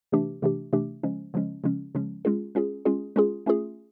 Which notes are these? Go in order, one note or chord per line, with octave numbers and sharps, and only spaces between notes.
C3 E3 A3 D4 G4
C3 E3 A3 D4 G4
C3 E3 A3 D4 G4
C#3 F3 G#3 C#4
C#3 F3 G#3 C#4
C#3 F3 G#3 C#4
C#3 F3 G#3 C#4
G#3 C#4 F4 G#4
G#3 C#4 F4 G#4
G#3 C#4 F4 G#4
G#3 C#4 F4 G#4
A3 C#4 F4 G#4